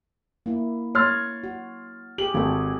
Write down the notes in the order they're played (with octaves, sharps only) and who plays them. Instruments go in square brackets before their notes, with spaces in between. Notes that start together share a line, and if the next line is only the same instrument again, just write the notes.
[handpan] A#3 E4
[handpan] C#5 [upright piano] C6 F6 A6
[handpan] F#4
[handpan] G4 G#4 [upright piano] F#7
[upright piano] G#1 [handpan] G#4 A4